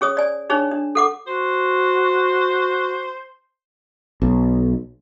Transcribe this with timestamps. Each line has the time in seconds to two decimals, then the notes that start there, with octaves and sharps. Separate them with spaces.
0.01 C#4 G#4 C#5 D#6
0.17 D5 G#5
0.50 D4 D#4 G#4 C#5
0.71 D4
0.95 A4 F#5 D6
1.27 F#4 C5
4.22 B1